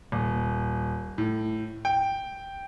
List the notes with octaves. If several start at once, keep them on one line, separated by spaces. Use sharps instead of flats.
D#1
A2
G5